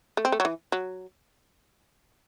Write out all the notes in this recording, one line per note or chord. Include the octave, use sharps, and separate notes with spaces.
A3
C4
A3
F#3
E3
F#3